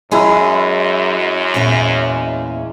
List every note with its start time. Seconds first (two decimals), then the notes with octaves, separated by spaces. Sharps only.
0.11 F#2 F#3 G#3 C#4 E4 G#4 A#5
1.54 E2 A#2 C#4